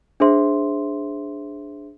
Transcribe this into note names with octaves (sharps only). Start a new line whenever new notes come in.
D4 G#4 C5 E5 C6